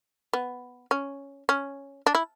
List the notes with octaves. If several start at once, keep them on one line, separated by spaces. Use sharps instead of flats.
B3
C#4
C#4
D4
E4